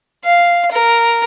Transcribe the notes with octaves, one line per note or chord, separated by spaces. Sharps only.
F5
A#4